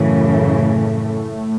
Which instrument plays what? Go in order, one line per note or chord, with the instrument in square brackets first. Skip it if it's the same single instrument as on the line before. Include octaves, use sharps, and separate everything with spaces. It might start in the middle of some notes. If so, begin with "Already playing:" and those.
Already playing: [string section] F#2 C#3 E3 [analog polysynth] A2 A3